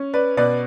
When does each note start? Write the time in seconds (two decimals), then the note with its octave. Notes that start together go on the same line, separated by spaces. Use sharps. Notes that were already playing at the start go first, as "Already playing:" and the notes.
Already playing: C#4
0.14 B4 D5
0.37 B2 B4 D5